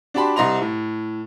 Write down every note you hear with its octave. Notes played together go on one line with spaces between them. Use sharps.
D4 F#4 G4 A5 B5 C6
C2 C3 D#5 A#5 C6 F7
A2